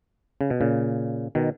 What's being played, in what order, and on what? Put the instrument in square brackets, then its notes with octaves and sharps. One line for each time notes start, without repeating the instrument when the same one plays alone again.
[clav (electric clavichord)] C#3
B2
A#2 C#3
B2 D#3